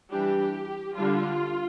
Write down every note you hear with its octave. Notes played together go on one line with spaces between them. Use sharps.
E3 G3 D4 G4
D3 G3 D4 F4